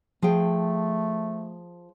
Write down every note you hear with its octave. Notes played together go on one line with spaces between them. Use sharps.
F3 A3 G#4 G5